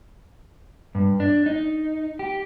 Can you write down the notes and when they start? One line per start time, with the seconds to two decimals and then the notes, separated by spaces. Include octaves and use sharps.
0.95 G2
1.20 D4
1.46 D#4
2.19 G4